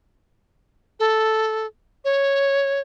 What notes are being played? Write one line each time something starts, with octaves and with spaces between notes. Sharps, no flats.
A4
C#5